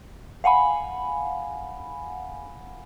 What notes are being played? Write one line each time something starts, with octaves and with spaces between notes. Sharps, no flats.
F5 F#5 G#5 B5